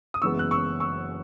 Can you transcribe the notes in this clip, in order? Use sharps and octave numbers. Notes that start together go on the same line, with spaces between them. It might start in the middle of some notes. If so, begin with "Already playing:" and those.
D#6
F#1 F#2 E3 G#3 B3 C#6 E6
F#6
C#6 E6
C#6 E6